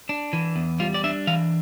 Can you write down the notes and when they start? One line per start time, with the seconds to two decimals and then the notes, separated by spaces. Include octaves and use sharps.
0.09 D4
0.33 E3
0.56 E2
0.80 G3 F4
0.94 D5
1.04 D4 E5
1.27 E3 F5